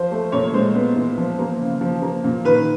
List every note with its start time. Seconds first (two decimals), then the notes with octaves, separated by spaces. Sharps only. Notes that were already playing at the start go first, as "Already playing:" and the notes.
Already playing: F3 C5
0.11 A3
0.32 A#2 C#5
0.54 G#3 C5
0.75 B3
0.96 E3
1.18 F3
1.39 A#3
1.60 C#3
1.81 F3
2.02 A#3
2.24 A#2
2.44 D#3 B4